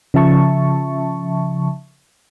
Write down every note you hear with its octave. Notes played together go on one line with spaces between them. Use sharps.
C#3 F3 E5 A5 C#6